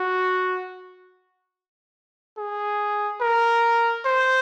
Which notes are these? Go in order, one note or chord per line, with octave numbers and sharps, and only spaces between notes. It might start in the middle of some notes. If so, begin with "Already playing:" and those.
Already playing: F#4
G#4
A#4
C5